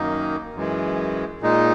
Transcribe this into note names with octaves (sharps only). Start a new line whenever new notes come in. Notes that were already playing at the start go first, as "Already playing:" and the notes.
Already playing: F#2 D#3 A#3 D#4
F#2 E3 G#3
A#2 G#3 D#4